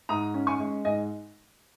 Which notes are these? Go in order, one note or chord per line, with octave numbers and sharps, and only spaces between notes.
G#2 A#5 D#6
C#4
G#5 C#6
G#3
G#2 D#5 G#5